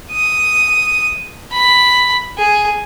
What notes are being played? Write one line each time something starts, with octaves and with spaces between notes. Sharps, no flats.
D#6
B5
G#4